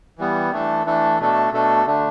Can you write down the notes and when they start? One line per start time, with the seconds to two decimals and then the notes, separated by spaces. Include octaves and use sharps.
0.18 E3 G3 B3
0.52 E3 A3 D4 A4
0.86 E3 A3 D4 A4
1.20 B2 A3 D4 A4
1.52 B2 A3 D4 A4
1.86 D3 A3 D4